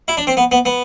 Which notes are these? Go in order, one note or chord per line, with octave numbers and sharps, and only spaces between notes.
E4
D4
C4
B3
B3
B3